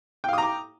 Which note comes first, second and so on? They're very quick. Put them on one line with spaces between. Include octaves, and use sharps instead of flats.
G5 F5 D#6 A#5 D6